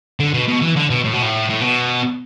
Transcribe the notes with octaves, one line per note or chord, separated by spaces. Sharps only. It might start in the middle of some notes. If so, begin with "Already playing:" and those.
D3
B2
B2
E3
D3
B2
A2
B2
A2
A2
B2